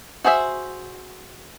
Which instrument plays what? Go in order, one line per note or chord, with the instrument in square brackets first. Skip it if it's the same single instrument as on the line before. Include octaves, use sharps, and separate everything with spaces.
[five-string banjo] F#4 G#4 C5 C#5 E5